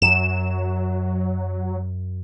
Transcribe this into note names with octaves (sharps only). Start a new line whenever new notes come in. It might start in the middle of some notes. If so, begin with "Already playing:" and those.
F#2 F#3 E7